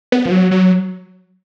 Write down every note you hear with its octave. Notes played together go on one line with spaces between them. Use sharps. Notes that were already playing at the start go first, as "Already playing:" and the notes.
B3
F3
F#3
F#3